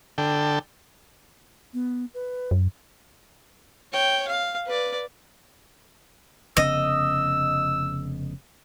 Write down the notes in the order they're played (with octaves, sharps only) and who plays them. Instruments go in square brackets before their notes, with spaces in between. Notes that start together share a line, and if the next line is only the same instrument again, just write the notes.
[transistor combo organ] D3 A4 G5
[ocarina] B3
B4
[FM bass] F#2
[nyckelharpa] C#5 G5
F5
B4 D5
[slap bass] F1 C#3 B3 [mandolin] D#5 [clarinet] E6